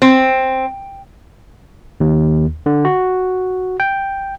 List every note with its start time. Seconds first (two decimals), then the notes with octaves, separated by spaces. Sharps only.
0.02 C4
2.00 D#2
2.66 D3
2.85 F#4
3.80 G5